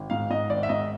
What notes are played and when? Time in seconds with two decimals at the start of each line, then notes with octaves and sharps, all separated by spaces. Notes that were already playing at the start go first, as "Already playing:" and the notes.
Already playing: G#1
0.10 G#2 F5
0.30 G#2 D#5
0.49 G#1 D5
0.63 E5
0.69 G#2 D#5